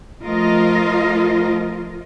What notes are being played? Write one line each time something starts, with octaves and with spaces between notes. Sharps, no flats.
F3 A3 F4 A#4 D#5